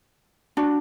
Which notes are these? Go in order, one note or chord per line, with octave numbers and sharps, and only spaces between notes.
D4 F#4